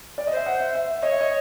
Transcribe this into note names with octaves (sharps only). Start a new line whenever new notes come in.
D5
D#5
C5 E5
F#5
E5
E5
C#5 D#5
E5
D#5